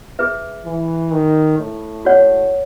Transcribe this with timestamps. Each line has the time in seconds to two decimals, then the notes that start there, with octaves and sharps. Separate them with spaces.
0.19 G#4 B4 E5
0.65 E3
1.12 D#3
1.59 A2
2.05 F#4 C#5 F#5